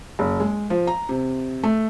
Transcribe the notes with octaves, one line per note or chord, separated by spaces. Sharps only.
F#1
G#3
F3
A#5
C3
A3